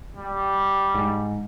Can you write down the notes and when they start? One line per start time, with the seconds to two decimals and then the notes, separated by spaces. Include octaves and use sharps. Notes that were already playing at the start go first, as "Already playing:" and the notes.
0.17 G3
0.95 G#2